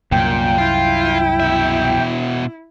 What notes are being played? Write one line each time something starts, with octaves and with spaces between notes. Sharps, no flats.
C2 F#2 A#2 G5
E4 F4
B2 E5